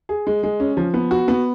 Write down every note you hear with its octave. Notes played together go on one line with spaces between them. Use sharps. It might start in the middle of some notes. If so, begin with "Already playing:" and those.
G#4
G#3
G#3
C#4
F3
B3
F#4
B3